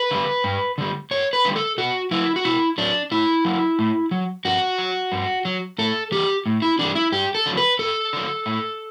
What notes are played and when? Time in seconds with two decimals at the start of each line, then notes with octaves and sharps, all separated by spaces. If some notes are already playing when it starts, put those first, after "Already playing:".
Already playing: B4
0.11 D3 G3
0.44 G2
0.78 D3 G3
1.11 G2 C#5
1.33 B4
1.45 D3 G3
1.56 A4
1.78 B2 F#4
2.11 F#3 E4
2.36 F#4
2.44 B2 E4
2.78 F#3 D4
3.11 A2 E4
3.45 F#3
3.79 A2
4.11 F#3
4.45 G2 F#4
4.78 F#3
5.12 G2
5.45 F#3
5.78 A2 A4
6.12 E3 G3 G4
6.46 A2
6.62 E4
6.79 E3 G3 D4
6.95 E4
7.12 G2 G4
7.35 A4
7.46 D3 F#3
7.57 B4
7.79 G2 A4
8.13 D3 F#3
8.46 A2